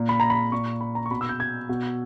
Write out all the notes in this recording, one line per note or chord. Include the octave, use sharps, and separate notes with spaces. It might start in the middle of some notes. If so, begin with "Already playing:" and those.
Already playing: A#2
B5
A#5
B5
A#2 C#6
B5
A#5
C#6
B2 B5
E6
G6
G#6
B2